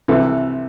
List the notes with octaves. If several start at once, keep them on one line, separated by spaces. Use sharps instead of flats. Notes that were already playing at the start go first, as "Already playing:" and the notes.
C2 C3 E3 A4